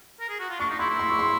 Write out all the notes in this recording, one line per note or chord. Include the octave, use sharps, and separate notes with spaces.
A#4
G#4
F#4
F4
D4 C#6
D#4
E4 C6
E4
C6
C#6
C6